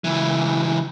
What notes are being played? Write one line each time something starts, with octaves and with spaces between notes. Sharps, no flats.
C#2 E3